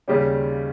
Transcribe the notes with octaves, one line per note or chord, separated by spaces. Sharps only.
D#2 C#3 G3 C#4 G4